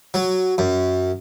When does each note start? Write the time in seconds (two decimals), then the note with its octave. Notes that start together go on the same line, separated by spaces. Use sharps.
0.14 F#3
0.58 F#2